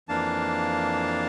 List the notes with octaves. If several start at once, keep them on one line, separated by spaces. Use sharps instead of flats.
F2 E3 A#3 D4 F5 A5